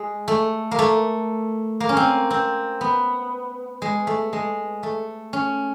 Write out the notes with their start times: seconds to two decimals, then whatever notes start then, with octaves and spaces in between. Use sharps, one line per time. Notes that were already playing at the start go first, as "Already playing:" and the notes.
Already playing: G#3
0.28 A3
0.71 A#3
0.79 A3
1.80 A#3
1.89 C#4
1.97 C4
2.30 C4
2.81 B3
3.82 G#3
4.07 A3
4.33 G#3
4.83 A3
5.33 C#4